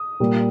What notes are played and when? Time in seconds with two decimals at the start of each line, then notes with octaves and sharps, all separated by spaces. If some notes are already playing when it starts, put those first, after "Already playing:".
Already playing: D#6
0.20 A#2 G3 A#3